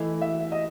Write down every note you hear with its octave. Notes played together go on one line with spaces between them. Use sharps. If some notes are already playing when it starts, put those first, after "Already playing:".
Already playing: E3 A3 E4 D#5
E5
D#5